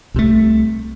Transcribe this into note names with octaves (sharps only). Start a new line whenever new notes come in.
C2 C3 A3